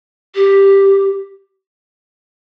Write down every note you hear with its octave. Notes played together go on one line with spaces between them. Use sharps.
G4